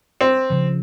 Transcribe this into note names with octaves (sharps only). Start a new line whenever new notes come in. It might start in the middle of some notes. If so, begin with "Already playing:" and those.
C4
C#3 F3